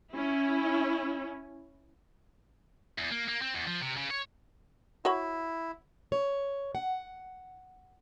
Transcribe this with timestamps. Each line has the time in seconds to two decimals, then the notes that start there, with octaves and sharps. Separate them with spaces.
0.12 C#4 E4
2.98 E2
3.12 A#3
3.29 A#3
3.42 C4
3.54 E2
3.67 F3
3.81 C3
3.97 C#3
4.10 C#5
5.05 E4 F#4 C#5 B5
6.12 C#5
6.75 F#5